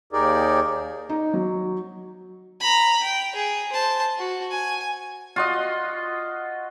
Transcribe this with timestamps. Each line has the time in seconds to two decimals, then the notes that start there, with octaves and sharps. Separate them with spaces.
0.13 D#2 D#4 G4 G#4 A#4 D5
1.09 D#4
1.34 F#3
2.60 A#5 B5
3.03 G5
3.35 G#4
3.72 C5 A5
4.18 F#4
4.51 G#5
5.36 F4 F#4 D#5